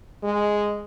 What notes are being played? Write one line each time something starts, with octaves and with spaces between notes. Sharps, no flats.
G#3